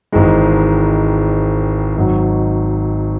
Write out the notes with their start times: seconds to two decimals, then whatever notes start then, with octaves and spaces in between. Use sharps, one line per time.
0.12 G#1 G#2 E3 G#3
1.96 G#1 G#2 F#3